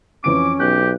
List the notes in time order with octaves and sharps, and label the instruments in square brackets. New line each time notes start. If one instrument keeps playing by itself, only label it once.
[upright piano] F2 E3 D7 [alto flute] C#4 [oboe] D6
[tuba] B1 [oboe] G4 [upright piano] F#6